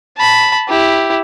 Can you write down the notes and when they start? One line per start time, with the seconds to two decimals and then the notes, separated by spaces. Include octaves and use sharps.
0.17 A5 B5
0.68 E4 G4